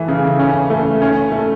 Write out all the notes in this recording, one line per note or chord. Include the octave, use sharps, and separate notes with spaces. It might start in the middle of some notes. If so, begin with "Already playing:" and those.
Already playing: E3 A3
C#3
C#4
A3
C#4
A3